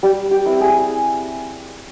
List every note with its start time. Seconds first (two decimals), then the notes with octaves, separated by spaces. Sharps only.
0.03 G3 G4
0.31 G4
0.46 C4 E4
0.61 G#4